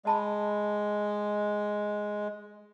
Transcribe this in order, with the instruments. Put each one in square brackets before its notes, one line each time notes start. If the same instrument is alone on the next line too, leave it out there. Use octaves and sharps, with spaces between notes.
[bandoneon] G#3 [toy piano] D#5 A5 B5